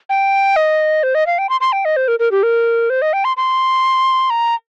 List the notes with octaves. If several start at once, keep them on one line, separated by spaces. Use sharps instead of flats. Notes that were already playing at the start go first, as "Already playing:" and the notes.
G5
D#5
C5
D#5
F5
G5
C6
C6
G5
D#5
C5
A#4
A#4
G4
A#4
C5
D#5
G5
C6
C6
A#5